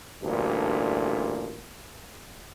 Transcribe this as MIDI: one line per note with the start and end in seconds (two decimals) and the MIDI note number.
0.23 1.63 33
0.23 1.63 38
0.23 1.63 43
0.23 1.63 46